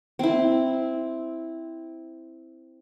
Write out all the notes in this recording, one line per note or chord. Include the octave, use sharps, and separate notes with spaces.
C4 E4